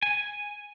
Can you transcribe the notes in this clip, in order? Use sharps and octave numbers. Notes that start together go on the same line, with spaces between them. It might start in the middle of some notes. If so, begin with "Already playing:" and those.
G#5